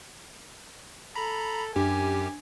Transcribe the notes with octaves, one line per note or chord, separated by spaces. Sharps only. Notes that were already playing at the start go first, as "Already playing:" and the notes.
A4 A#5 B5
F#2 D4 G4 G#5